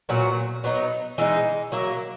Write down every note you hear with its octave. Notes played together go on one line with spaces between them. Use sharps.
A#2 F#3 B3 F#4
F#3 B3 D#4
E3 G#3 D#4
F#3 A#3 E4